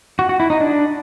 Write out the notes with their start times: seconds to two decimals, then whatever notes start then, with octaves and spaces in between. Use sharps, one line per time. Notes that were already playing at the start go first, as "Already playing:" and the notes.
0.19 F#4
0.29 F#4
0.40 E4
0.50 D#4
0.60 D4